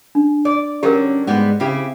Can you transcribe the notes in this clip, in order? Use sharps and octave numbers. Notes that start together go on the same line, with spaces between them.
D4
D5
D3 F#3 G3 C#4 G4 A#4
G#2 G3 G#3 B3
C#3 C4 E4 G4